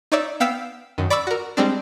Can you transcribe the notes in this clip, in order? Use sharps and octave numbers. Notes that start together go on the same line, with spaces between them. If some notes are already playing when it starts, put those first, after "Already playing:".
D#4 C#5 D5 E5
B3 F5 G5 E6 B6 E7
F#2 D#3
D5 B5 C#6 D6 E6
F#4 A#4
G3 G#3 C4 D4